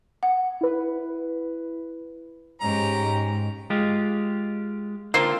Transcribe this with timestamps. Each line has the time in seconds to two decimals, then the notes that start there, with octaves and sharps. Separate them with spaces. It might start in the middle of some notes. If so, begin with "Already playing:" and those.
0.23 F#5
0.61 E4 B4
2.61 G#2 C#4 G4 A#5
3.70 G#3 F4 G4
5.14 D3 A#3 C4 F4